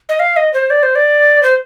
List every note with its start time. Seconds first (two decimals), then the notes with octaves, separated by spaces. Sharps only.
0.09 D#5
0.20 F5
0.37 D#5
0.54 C5
0.70 D5
0.83 C5
0.95 D5
1.43 C5